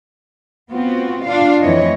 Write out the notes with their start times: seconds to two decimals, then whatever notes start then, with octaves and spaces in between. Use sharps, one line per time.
0.71 B3 C4 F4 F#4
1.26 D4 F4 F5
1.61 F2 E3 A3 C4 C#5 D#5